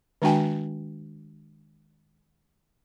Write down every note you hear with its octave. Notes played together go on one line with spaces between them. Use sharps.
D#3 G#3 D4 F#4 G5 G#5